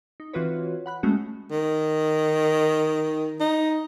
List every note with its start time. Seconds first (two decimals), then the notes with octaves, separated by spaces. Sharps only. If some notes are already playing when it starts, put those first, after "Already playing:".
0.20 D#4
0.33 E3 C4 F4 F#4 B4 C#5
0.86 F#5 B5 F#6
1.03 G#3 A3 C#4 F#4
1.51 D#3
3.41 D#4